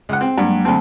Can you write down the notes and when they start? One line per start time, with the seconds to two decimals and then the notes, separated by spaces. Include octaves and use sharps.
0.09 C#2 F#5
0.21 C4 G5
0.38 G2 F#3 G#3 A#3
0.65 D2 C4 A5 B5